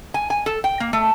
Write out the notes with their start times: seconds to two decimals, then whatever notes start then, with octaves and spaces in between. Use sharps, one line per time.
0.14 G#5
0.30 G#5
0.46 A4
0.64 G5
0.80 A#3
0.93 A3